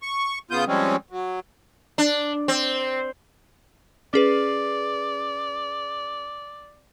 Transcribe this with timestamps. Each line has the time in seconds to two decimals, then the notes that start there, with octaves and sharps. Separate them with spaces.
0.02 C#6
0.51 C#3 B3 F4 D#6 G6
0.67 F3 G3 G#3 C4 C#4
1.10 F#3
1.98 D4
2.48 C4
4.14 C#4 G#4 B4 D5